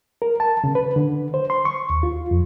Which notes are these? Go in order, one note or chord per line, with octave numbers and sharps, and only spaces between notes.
A#4
A5
C#3
B4
D3
C5
C6
C#6
D#2
F4
F2